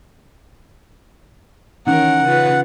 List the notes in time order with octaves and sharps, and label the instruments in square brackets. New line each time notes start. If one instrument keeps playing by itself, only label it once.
[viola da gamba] D#3 A#4 [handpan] E3 C#4 D#4 [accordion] F#5
[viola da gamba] C#3 F4 B4